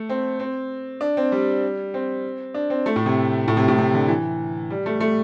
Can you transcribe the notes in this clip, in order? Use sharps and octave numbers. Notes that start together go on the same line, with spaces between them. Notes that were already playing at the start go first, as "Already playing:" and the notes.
Already playing: A3
C4
C4
D4
C4
G3
C4
D4
C4
A3
A2
C3
A2
C3
A2
C3
D3
E3
G3
A3
A3